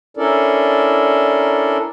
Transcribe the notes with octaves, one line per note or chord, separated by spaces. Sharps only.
C#4 D4 E4 A4 A#4 D5